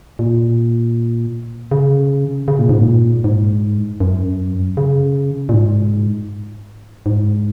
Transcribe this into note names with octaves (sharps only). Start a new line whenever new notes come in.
A#2
C#3
C#3
A#2
G#2
A#2
G#2
F#2
C#3
A#2
G#2
G#2